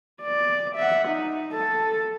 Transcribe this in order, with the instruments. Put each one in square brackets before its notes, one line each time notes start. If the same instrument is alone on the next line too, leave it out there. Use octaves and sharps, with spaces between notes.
[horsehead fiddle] D5
E5 F#5
D#4
A4